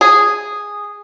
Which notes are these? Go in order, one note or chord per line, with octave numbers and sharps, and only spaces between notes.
G#4